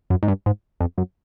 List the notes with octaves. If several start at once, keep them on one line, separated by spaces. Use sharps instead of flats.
F#2
G#2
G2
G#2
F2
F#2